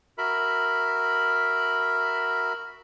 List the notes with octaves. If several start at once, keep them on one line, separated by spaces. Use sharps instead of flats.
F#4 A#4 E5 B5